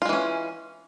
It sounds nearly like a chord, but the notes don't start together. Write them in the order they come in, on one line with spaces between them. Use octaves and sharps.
F4 G#3 E3 C#4